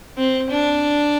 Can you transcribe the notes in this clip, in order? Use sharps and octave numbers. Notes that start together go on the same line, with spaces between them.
C4
D4